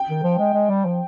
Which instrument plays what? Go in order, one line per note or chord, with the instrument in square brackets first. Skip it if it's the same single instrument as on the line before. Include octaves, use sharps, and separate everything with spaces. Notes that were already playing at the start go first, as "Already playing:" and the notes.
Already playing: [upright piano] G5
[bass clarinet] D#3
F3
G#3
G#3
G3
F3